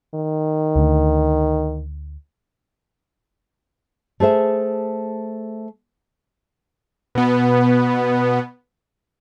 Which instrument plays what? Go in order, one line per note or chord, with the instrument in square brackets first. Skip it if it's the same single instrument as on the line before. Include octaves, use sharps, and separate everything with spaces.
[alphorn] D#3
[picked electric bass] D2 D3 A3
[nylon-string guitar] A3 G#4 C5 E5
[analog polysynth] B2 B3